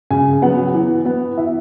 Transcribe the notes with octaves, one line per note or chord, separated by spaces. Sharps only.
C#3 G#5
F#3 B3 F#5
E3
B3
E3 E5